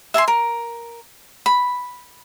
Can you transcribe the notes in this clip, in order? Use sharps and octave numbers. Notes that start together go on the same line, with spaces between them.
E5 G#5 A5 C6
A#4
B5